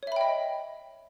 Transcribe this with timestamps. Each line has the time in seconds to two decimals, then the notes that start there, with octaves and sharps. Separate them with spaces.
0.03 C#5
0.07 E5
0.12 B5
0.16 G5
0.21 D#5